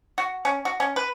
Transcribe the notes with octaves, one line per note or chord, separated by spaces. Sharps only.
F#4
C#4
F#4
C#4
B4